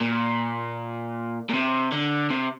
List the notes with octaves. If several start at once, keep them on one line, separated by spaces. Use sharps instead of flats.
A#2
A#2
C3
D3
C3